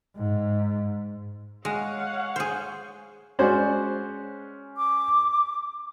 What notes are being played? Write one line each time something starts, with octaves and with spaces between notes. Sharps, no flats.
G#2
G#3 C#5 F5 F#5
G#4 C5
G#3 C#4 F#4 C5 D5
D6